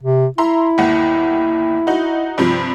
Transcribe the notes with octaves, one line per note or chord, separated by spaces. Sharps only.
C3
E4 E5 A#5 C6
G1 D#2 F#5
D#4 F#4
G2 C3 F3